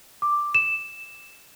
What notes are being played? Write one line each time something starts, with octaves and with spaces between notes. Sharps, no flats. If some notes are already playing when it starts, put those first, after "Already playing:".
D6
E7